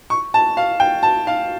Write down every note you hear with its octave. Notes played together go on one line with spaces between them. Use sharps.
C#6
A5
F5
G5
A5
F5